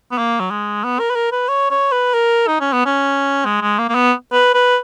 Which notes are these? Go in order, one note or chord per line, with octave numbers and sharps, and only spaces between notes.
B3
A#3
F#3
G#3
B3
A#4
B4
A#4
B4
C#5
C#5
B4
A#4
D#4
C#4
B3
C#4
G#3
G#3
A#3
A#3
B3
B4
B4